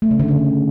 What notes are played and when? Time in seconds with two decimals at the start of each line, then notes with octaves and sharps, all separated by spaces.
0.02 A3
0.11 C#3
0.20 D3
0.28 C#3